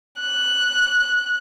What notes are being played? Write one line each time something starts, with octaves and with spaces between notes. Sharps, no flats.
F#6